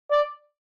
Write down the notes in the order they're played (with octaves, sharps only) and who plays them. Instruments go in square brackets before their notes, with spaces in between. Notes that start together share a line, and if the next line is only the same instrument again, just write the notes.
[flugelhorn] D5